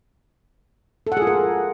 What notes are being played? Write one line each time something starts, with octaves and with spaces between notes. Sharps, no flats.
A4
F#5
G#4
F4
A#4